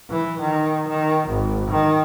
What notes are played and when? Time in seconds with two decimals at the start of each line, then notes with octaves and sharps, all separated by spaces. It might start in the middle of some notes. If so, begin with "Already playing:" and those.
0.10 E3
0.40 D#3
0.89 D#3
1.29 G#1
1.71 D#3